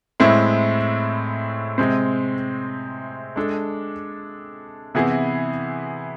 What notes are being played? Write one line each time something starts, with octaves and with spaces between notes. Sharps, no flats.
A2 G#3 C4 E4
C3 G#3 C4
G#3 D4 A4
C3 E3 B3 E4 G#4